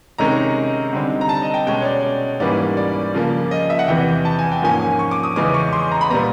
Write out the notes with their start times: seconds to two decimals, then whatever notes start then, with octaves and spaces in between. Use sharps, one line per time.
0.18 C3 D#3 G#3 C#4 A#5
0.93 D3 G3 C4 D#4
1.21 A#5
1.29 A5
1.42 D#5
1.54 G5
1.67 B2 G#3 C#4 G5
1.81 C#5
1.85 D5
2.40 G#2 E3 G3 A#3 C#4 D5
2.77 D5
3.14 C#3 F3 A#3
3.51 D#5
3.70 E5
3.79 F#5
3.88 E2 C3 E3 G5
4.25 A5
4.39 G#5
4.52 G5
4.62 G#2 F3 A#3 C#4 G#5
4.99 C#6
5.11 D6
5.23 D#6
5.36 E2 C#3 E3 G#3 C#4 D6
5.54 C#6
5.73 C6
5.91 A#5
6.01 B5
6.10 A#2 G3 B3 A#5